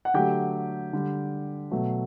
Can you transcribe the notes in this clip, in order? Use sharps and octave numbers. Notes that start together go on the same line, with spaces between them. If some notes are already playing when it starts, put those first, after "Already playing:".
F#5
D3 F#3 A3 G4 G5
D3 G3
B2 F#3 A3